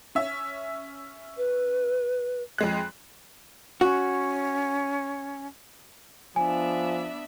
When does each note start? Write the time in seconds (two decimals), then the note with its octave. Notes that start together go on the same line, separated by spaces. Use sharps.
0.15 C#4 E5
1.37 B4
2.58 F2 G#3 F#6
3.81 C#4 F#4
6.36 F3 B3 D4 E5 G#5